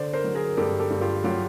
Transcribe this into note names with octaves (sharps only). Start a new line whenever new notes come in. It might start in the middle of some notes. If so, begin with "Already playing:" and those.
Already playing: D3 C5 D5
A#4 C5
F#3
G#4 A#4
G2 G4 A4
G4 A4
G2
F4 G4
F#3 F4 G4